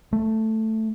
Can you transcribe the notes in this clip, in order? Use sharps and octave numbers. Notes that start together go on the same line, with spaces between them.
A3